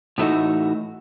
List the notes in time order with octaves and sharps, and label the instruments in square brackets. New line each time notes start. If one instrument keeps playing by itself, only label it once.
[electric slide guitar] A2 E3 F#3 A3 D#4 F#4